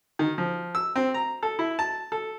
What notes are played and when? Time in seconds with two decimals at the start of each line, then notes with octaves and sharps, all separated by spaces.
0.19 D#3
0.38 F3
0.75 E6
0.96 C4
1.14 A#5
1.43 A4
1.59 E4
1.79 A5
2.12 A4